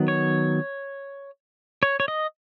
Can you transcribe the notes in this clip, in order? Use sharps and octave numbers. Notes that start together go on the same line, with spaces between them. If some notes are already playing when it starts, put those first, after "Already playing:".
Already playing: D#3 F#3 B3
C#5
C#5
C#5
D#5